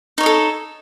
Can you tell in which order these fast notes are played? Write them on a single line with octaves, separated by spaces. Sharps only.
D#4 C#5 D#5 A4